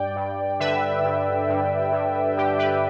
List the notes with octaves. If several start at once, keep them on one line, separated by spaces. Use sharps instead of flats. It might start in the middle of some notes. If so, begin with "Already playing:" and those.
Already playing: G2 D5 G5
G2
D3 B4 E5
G2
G2
G2
D3 G4
G4 B4